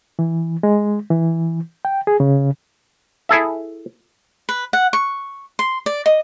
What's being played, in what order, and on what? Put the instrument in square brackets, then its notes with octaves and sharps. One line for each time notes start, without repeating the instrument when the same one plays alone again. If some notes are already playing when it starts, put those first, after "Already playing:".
[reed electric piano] E3
G#3
E3
G5
G#4
C#3
[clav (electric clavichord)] E4 G#4 A4 E5
[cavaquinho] B4
F#5
C#6
C6
D5
D#5